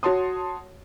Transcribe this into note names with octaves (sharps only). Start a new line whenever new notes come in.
F#4 C#5 A5 C6 D#6